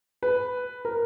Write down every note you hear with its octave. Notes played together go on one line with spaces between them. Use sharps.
B4
A#4